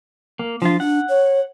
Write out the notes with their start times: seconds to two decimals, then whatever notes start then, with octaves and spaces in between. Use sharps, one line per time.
0.39 A#3
0.62 F3 D4 F4
0.80 D4 F#5
1.09 C#5